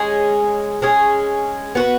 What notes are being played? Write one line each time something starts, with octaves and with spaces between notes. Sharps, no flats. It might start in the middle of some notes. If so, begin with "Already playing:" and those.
Already playing: G#3 C#4 G#4
G#3 C#4 G#4
B3 F#4 B4